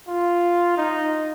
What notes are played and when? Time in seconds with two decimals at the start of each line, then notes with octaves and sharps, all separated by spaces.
0.08 F4
0.78 D#4